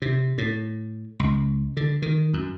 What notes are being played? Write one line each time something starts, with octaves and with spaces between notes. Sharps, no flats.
C3
A2
C#2
D3
D#3
F#2